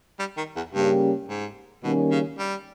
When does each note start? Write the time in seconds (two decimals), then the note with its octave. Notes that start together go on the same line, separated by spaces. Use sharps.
0.19 G3
0.37 D#3
0.56 E2
0.73 G2 C#3 G3 A#3 C#4 G4
1.29 G#2
1.83 B2 D#3 G3 A#3 C#4
2.11 C#3
2.38 G3